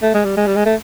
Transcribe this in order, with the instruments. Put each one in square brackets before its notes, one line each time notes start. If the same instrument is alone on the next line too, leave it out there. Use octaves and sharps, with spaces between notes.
[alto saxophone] A3
G#3
G3
G#3
G3
G#3
A3